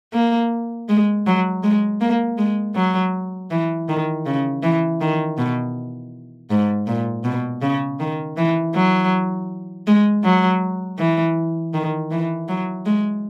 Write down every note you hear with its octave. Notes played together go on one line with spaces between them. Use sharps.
A#3
G#3
F#3
G#3
A#3
G#3
F#3
E3
D#3
C#3
E3
D#3
B2
G#2
A#2
B2
C#3
D#3
E3
F#3
G#3
F#3
E3
D#3
E3
F#3
G#3